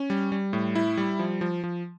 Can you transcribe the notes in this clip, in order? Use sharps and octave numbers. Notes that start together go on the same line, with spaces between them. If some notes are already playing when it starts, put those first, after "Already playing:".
Already playing: C#4
G3
G3
A2
E4
G3
F3
F3
F3